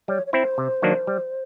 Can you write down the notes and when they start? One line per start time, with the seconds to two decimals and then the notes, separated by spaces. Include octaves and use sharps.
0.08 G3 C#5
0.26 C#5
0.33 C4 E4 C5
0.58 C3
0.82 D#3 F#3 A#3 D4
1.07 G3